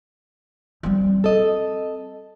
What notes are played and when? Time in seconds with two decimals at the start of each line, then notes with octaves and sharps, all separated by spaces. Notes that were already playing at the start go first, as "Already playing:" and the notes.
0.83 G3 C4
1.24 C4 A4 D#5